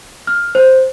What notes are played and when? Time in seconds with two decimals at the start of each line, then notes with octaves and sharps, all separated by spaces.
0.27 F6
0.55 C5